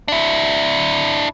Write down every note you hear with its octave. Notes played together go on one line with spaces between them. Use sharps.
D4 E4